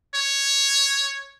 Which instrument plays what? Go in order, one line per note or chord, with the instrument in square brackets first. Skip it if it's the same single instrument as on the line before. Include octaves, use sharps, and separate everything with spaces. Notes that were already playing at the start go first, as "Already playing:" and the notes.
[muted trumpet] C#5